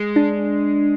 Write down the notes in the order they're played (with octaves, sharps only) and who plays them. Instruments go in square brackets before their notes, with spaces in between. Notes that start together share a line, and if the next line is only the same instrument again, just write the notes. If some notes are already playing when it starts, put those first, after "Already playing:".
Already playing: [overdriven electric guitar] G#3
[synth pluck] D4